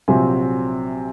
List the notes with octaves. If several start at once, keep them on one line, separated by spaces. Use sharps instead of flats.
A#1 C3 F#3 C4 E5 G#5